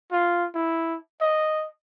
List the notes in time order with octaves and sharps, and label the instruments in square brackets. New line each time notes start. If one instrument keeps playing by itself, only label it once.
[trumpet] F4
E4
D#5